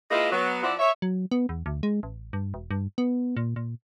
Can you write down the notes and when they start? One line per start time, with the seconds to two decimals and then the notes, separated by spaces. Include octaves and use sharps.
0.11 G#3 A#3 E4 F4 B4 D#5
0.32 F#3 B3
0.62 F3 C4 E4 D5 F#5
0.79 C#5 E5
1.02 F#3
1.31 B3
1.49 E2
1.66 D2
1.83 G#3
2.03 A1
2.33 G2
2.54 E1
2.71 G2
2.98 B3
3.37 A#2
3.56 A#2